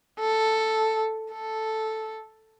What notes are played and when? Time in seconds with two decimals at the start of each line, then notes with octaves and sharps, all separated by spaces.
0.20 A4
1.33 A4